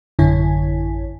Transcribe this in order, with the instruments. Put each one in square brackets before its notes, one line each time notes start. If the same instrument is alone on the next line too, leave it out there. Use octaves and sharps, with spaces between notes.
[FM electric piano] A1 F#2 D3 E4 C#5 G#5